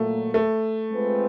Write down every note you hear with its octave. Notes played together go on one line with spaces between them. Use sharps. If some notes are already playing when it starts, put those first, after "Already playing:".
Already playing: A#2 F#3 A3 A#3
A3
G#3 C4 F4 G#4 B4